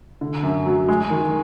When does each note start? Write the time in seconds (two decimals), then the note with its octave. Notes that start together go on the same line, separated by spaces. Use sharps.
0.21 D3
0.43 F#2
0.66 F#3
0.89 G#3
1.10 D#3